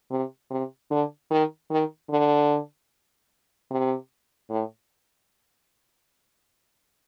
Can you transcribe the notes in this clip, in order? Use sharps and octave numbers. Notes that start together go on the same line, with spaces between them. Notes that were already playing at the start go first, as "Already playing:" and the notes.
C3
C3
D3
D#3
D#3
D3
C3
A2